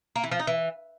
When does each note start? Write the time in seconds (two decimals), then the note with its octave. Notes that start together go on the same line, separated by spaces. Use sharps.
0.16 A#3
0.23 E3
0.31 F3
0.39 D#4
0.47 E3